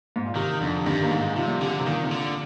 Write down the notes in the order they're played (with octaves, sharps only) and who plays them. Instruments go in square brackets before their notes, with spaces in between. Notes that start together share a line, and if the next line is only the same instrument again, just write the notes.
[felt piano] G#2
A#2
[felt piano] C3 [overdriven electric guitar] D#3
[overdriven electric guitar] F2 [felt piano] D3
[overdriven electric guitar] G2 [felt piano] D#3
[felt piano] A#3
[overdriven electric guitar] G#2 [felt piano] G#3
[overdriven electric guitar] C3 [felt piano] F3
[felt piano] G3
[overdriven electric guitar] D3
[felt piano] C3
[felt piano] A#2 [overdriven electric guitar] D#3
[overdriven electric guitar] C3
D3